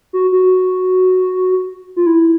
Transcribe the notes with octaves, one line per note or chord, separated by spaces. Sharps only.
F#4
F#4
F4
E4